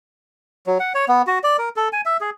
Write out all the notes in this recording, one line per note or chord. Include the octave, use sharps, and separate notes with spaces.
F#3
F#5
C#5
B3
F#4
D5
A#4
A4
G#5
E5
G#4